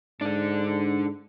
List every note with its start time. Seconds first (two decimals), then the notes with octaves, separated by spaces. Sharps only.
0.21 G#2 D3 D4